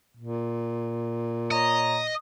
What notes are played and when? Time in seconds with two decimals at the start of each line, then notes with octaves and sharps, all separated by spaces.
0.17 A#2
1.51 C#5 D#5 A#5